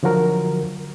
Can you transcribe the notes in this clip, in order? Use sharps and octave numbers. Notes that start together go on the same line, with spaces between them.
D3 F3 F#3 F#4 A#4